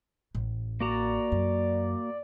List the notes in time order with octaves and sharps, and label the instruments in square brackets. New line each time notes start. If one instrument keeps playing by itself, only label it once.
[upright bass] A1
[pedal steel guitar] A#3 F#4 A#5 [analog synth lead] D5
[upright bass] F#2